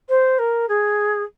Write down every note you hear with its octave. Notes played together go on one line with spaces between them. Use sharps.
C5
A#4
G#4